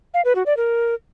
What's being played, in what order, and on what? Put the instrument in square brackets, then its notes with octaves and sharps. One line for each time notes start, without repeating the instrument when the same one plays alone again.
[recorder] F5
B4
F#4
D5
A#4